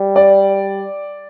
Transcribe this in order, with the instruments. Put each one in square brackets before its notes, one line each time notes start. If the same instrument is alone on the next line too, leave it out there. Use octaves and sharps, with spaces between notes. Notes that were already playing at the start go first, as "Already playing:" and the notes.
Already playing: [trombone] G3
[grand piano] D5